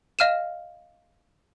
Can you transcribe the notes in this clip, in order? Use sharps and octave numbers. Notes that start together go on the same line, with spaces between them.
D#5 F5 F6 D#7 E7